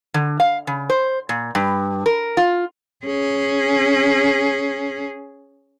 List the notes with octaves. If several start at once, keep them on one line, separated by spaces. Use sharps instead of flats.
D3
F5
C#3
C5
A#2
G2
A#4
F4
C#4 G#4